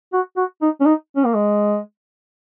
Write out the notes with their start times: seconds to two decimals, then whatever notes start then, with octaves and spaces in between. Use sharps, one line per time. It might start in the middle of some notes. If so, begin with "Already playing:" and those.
0.13 F#4
0.37 F#4
0.62 D#4
0.81 C#4
0.86 D#4
1.17 C#4
1.25 A#3
1.34 G#3